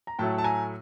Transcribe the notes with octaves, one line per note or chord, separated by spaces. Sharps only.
A#5
A2 F#3 A3 G5 A5
A5
G#5 A#5